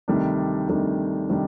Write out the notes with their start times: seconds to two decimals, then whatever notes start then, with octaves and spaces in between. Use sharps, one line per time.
0.08 D2 C3 D#3 G3 D4
0.68 D2 C3 D#3 G3 D4
1.29 C3 D#3 G3 D4